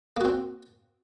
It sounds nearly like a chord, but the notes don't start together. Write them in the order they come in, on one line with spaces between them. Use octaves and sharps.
A#3 F#4 C4